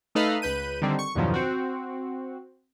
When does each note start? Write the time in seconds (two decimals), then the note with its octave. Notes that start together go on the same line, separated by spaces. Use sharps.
0.15 A3 D#4 A4 B4 D#5 F5
0.42 C#2 B4 G6 D#7
0.82 D3 D#3 G3 C4
0.99 C#6
1.15 E2 G2 B2 D#3 F3 F#3
1.34 C4 F#4